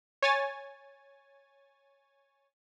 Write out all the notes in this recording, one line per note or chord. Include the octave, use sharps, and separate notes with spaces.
C#5 G#5 A6